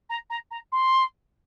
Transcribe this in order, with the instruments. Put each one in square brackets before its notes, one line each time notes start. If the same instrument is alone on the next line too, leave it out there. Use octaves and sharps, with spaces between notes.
[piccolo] A#5
A#5
A#5
C6